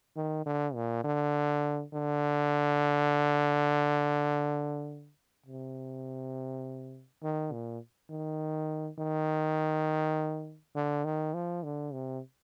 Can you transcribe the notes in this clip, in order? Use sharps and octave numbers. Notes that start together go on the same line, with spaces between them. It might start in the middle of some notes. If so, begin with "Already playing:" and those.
D#3
D3
A#2
D3
D3
C3
D#3
A#2
D#3
D#3
D3
D#3
F3
D3
C3